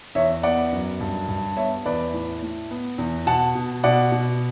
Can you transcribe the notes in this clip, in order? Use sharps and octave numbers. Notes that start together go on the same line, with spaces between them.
E2 C#5 E5
B3 D5 F#5
F#2
G2
G2
B3 C#5 E5
E2 B4 D5
A2
A2
B3
E2
B2 F#5 A5
B2
B2 D5 F#5
B2